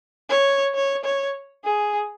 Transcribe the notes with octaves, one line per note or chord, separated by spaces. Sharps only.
C#5
C#5
C#5
G#4